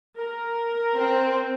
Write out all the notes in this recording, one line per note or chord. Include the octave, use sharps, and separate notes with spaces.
A#4
C4